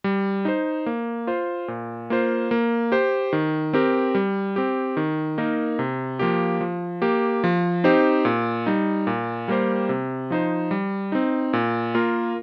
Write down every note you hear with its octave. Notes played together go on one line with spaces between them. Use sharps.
G3
D#4 C5
A#3
F4 C5
A#2
A#3 F4 C5
A#3
G4 C5
D#3
C4 G4 A#4
G3
C4 G4
D#3
A#3 D#4 A#4
C3
F3 A#3 G4
F3
A#3 G4
F3
C4 D#4 G4 C5
A#2
G3 D#4
A#2
G3 A#3 G4 C5
C3
F3 D#4 C5
G3
C4 D#4
A#2
A#3 F4 A#4